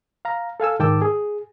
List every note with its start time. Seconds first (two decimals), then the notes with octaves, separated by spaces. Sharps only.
0.25 F5 A#5
0.60 A4 F5 G#5 E6
0.79 G#2 D#3 G5 A5 D6 E6
1.02 G#4